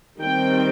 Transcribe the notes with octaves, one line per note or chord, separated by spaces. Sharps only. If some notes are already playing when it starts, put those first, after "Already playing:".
D#3 G3 C4 G5